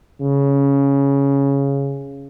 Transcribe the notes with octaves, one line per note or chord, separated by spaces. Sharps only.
C#3